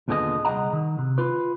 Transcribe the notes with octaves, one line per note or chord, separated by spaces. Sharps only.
D#2 A#2 D3 B3 G#4 D#5
C2 F3 G#4 D#5 F#5 A#5
D#3
C3
F4 B4